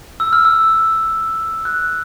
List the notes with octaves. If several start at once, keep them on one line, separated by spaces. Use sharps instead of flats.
E6
F6
E6
F#6